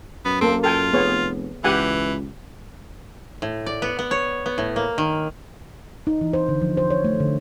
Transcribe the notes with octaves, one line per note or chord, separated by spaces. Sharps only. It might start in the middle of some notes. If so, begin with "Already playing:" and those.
F#2 B3
A#3 C4 A4
F4 A4 G5 G#5
F1 B3 G#4 C#5
C#2 E3 G4 F#5 G#5
A2
D5
B3
B3
C#5
B3
A2
A#3
D#3
D#4
E3
C5
D3
F3
C5
C#5
A3
D3